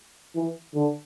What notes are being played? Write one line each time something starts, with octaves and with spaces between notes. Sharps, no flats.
E3
D3